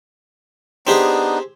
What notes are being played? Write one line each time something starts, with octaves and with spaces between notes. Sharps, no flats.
B3 C4 D4 D#4 G4 G#4